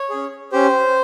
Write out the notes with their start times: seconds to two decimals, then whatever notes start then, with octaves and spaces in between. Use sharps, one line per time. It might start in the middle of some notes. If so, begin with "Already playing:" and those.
Already playing: C#5
0.10 C#4 G#4
0.52 C#4 G4 C5